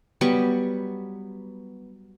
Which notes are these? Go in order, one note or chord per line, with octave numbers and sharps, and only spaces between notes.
F#3 G3 B3 C#6